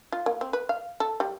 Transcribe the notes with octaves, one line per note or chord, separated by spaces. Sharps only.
F4
A#3
C4
B4
F5
A4
G3